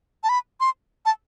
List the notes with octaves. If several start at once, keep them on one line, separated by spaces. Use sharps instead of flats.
A5
B5
C6
A5